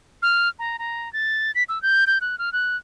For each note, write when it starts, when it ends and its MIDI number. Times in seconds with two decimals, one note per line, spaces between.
0.22 0.49 89
0.59 0.77 82
0.79 1.11 82
1.13 1.51 93
1.55 1.63 95
1.69 1.81 88
1.82 2.04 91
2.07 2.18 91
2.21 2.38 90
2.38 2.52 89
2.53 2.76 90